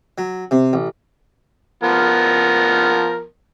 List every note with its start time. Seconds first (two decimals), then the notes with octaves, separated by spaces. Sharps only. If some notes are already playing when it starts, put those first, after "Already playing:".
0.18 F#3
0.51 C3
0.73 A1
1.83 F3 B3 A#4